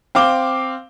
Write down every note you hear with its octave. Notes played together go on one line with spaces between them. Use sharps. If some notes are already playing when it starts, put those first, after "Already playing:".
C4 F5 D6 G7